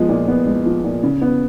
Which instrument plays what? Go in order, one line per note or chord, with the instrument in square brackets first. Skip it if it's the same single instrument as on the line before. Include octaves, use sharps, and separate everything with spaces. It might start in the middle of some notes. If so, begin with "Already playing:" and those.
Already playing: [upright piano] F3 G#3 B3
A#2
B3
G#3
F3
A#2
C#3
B3